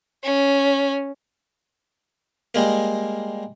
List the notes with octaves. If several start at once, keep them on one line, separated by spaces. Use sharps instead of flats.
C#4
G3 G#3 A#3